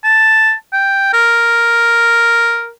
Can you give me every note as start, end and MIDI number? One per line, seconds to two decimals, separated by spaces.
0.04 0.53 81
0.73 1.09 79
1.13 2.70 70